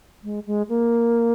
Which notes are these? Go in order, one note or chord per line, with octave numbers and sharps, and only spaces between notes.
G#3
G#3
A#3